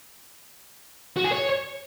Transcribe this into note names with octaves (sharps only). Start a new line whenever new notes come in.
F#4
G#4
C#5